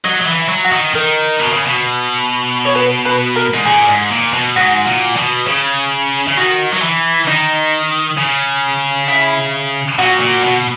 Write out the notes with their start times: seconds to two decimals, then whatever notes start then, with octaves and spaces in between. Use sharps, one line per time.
0.05 F#3 D#4
0.22 F#3
0.27 E3
0.34 E4
0.49 F#3
0.64 F#4
0.72 D#3
0.94 D#3 A#4
1.40 B2
1.52 C#3
1.66 B2
2.65 C#5
2.75 B4
3.05 B4
3.36 A#4
3.54 G#2
3.65 A#2 G#4
3.89 G#2
4.11 A#2
4.33 B2
4.56 G#2 F#4
4.86 A#2
5.16 B2
5.47 C#3
6.28 C#3
6.37 D#3 F#4
6.73 F#3
6.82 E3
7.27 D#3 D#4
8.18 C#3
9.08 E4
9.98 A#2 F#4
10.21 A#2
10.43 B2